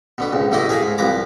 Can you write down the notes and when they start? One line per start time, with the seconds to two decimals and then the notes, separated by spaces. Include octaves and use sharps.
0.18 B2 D3 B3
0.33 C#2 G#2
0.51 A1 B2 A3 E4 D5 D#5
0.69 G#4 A#4 E5 F5
0.83 G#2
0.98 C2 F3 B4 A#5 D6